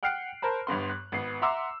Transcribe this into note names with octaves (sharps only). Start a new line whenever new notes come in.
F#5 G5 F6 F#6 C7 D7
A#4 C5 A5 B5
G1 G2 B3 C6
F#6
G#1 B3 C7
E5 F#5 A#5 C6 D6 E6